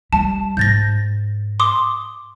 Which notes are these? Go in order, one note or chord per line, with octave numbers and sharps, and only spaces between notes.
G3 A5
G#2 G6 A6 A#6
C6 D6 D#6